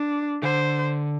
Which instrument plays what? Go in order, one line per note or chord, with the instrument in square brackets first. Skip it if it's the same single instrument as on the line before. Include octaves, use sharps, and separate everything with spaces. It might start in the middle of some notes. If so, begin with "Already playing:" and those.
Already playing: [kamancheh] D4
[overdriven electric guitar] D3 [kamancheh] C5